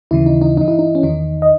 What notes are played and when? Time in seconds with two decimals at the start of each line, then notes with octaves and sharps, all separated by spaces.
0.11 D#2 C#3 E3 E4
0.26 D#4
0.41 D#4
0.57 G2 E3 D#4
0.68 E4
0.79 D#4
0.95 C#4
1.03 E2 D#3 D#4
1.42 D#5